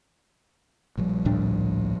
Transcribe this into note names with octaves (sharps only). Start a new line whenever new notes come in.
A#1 F3 G3
D2 A2 D4